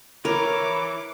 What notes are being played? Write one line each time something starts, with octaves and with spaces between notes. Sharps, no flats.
E3 A#4 B4 C#5 D6